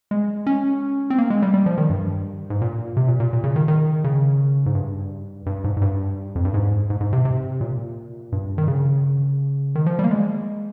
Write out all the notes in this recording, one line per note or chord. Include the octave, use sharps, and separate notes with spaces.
G#3
C#4
C4
A#3
G#3
G3
G3
F3
D#3
G2
G#2
A#2
C3
A#2
A#2
A#2
C#3
D#3
D#3
C#3
G#2
G2
G2
G#2
G#2
G2
F2
G2
G#2
G#2
G#2
C3
C3
A#2
G2
D#3
C#3
D#3
F3
G3
A#3
G#3